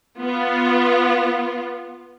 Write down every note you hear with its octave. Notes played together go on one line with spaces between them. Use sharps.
B3 F4